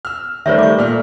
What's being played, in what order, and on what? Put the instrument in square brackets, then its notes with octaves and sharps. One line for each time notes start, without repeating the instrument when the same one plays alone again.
[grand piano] E6 F6
[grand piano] D#3 G3 A3 [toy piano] C5 C#5 E5
[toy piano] C#6 D6
[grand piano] A#2 A3 F6